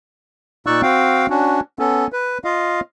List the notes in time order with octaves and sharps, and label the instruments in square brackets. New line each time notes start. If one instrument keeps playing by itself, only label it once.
[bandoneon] A#2 D#4 D5 C#6 E6 F#6
C4 F#4 F5 G5
C#4 D4 F#4
B3 C#4 A4
B4
F4 D#5 F5